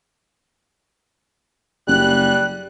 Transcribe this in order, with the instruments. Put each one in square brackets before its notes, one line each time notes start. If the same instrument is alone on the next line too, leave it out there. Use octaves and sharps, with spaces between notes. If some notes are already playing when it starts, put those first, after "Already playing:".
[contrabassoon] F#1 [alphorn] G3 [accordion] F#6